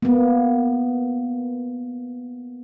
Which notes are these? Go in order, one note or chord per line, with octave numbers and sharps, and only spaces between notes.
A#3 B3